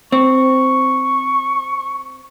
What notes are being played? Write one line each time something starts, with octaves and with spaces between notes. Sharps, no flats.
C4 C#6